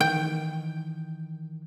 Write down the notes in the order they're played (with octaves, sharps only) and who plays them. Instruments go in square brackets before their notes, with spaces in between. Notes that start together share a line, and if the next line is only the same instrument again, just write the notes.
[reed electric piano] D#3 E3 [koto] G5